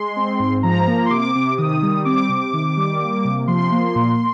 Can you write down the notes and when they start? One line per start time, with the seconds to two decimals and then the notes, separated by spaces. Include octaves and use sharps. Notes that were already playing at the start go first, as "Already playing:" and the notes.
Already playing: G#3 C6
0.16 C4
0.40 G#2
0.63 F3 A#5
0.87 A#3
1.06 C6
1.10 C3 D6
1.35 C3
1.58 D#3 D#6
1.83 G3
2.05 C4 D6
2.29 C3
2.54 D#3
2.77 G3
3.00 A#3
3.25 C3
3.48 F3 C6
3.72 A#3
3.96 A#2